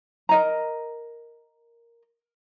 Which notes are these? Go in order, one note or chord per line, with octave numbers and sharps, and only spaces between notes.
A#4 D#5 A#5